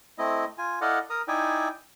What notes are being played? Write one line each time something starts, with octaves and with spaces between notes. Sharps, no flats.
A3 C4 E4 D#5
F4 G#5
E4 A4 D5 D#5 F5 F#5
A#4 A#5 D#6
D#4 E4 D5 E5 G5 G#5